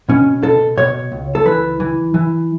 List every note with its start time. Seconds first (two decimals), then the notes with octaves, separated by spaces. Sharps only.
0.09 B2 C#4
0.43 B2 A4
0.77 B2 C#5
1.12 C#2
1.35 A4
1.45 E3 B4
1.80 E3
2.14 E3